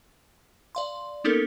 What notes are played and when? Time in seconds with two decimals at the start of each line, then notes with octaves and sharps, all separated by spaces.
0.75 D5 F5 C6
1.24 A#3 B3 C#4 D#4 A4 A#4